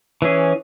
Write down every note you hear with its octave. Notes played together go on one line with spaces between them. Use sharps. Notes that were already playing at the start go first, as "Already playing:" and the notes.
E3 C#4 G#4